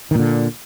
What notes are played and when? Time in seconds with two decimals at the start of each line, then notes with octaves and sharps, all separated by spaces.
0.11 D#3
0.15 A#2
0.19 D3